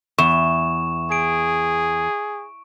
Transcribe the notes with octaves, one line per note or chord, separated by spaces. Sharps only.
E2 C#6 E7
G#4 D7